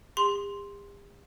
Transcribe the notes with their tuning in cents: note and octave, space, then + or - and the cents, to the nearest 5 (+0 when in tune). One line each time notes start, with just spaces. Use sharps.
G4 +45 C6 +0